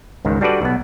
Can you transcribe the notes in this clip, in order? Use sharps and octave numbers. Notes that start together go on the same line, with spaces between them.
C#2 G#2 D#3
G3 D4 F#4 A4 B4 D5
B1 B3